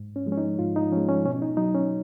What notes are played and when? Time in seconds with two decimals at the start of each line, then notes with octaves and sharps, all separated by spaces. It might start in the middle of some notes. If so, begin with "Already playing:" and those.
Already playing: G#2
0.16 C#4
0.26 F3 G#3
0.32 C#4
0.37 D#4
0.59 G#2 F4
0.76 D#4
0.92 F3 C#4
0.97 G#3
1.09 C#4
1.25 B2 C#4
1.42 D#4
1.57 F#3 D#4
1.74 C#4